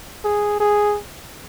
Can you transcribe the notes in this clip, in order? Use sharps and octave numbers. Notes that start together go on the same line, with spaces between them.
G#4
G#4